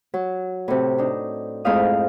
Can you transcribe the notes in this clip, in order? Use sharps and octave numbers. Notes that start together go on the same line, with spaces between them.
F#3
A2 C3
D4 D#4
F2 G#2 A3 E4 F5 D#6